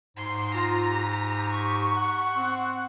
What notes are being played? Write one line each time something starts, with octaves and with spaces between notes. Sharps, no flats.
G#2 C6
F4 A#5
G4
C#6
F#5
C4